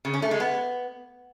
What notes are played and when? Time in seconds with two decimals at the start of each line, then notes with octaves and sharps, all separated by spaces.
0.05 C#3
0.14 C#4
0.22 A3
0.31 G#3
0.40 B3